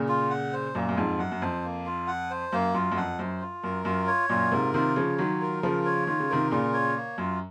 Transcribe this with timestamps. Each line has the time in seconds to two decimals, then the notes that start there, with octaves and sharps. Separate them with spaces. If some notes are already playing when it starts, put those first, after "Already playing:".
Already playing: A#2 C#3
0.08 F4
0.30 F#5
0.53 C5
0.75 F#2 A#2 A#3
0.89 F#2
0.96 F2 G#2 F4
1.19 F#2 F#5
1.32 F#2
1.42 F2 C5
1.63 A#3
1.86 F4
2.07 F#5
2.31 C5
2.53 F#2 A#3
2.74 F#2 F4
2.92 F#2
2.97 F2 F#5
3.19 F#2 C5
3.41 F4
3.64 F#2 A#4
3.85 F#2 F4
4.07 C#5
4.29 F#2 A#2 F4
4.52 G#2 C3 A#4
4.74 C3 D#3 F4
4.96 C#3 F3 C#5
5.18 D#3 F#3 F4
5.41 A#4
5.63 C#3 F3 F4
5.86 C#5
6.07 D#3 F4
6.20 C#3
6.30 C3 D#3 A#4
6.51 A#2 C#3 F4
6.73 C#5
6.96 A#3
7.18 F#2 F4